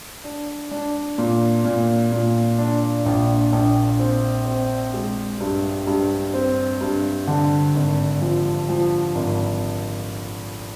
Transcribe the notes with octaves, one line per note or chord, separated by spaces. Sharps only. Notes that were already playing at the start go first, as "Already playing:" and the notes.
D4
D4
A#2
A#2
A#2
D4
A#1
A#1
C4
C4
G#3
G2
G2
C4
G2
D3
G#1
F3
F3
G#1